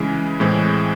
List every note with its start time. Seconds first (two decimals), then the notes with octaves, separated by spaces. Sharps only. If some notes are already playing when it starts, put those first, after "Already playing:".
Already playing: C#3 E3 G#3
0.40 A2 E3 G#3 C4